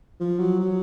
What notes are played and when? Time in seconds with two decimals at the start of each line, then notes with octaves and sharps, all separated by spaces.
0.20 F3
0.39 F#3
0.60 F#3